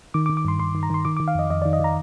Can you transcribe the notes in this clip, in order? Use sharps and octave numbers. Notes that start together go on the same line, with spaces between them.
D#3 D6
D6
D#3
D6
G2 C6
G2 C6
D#3
A#5
D#3 C6
D#3 D6
D#3 D6
F5
F2 D#5
F2 D#5
D#3 D5
D#5
D#3 A#5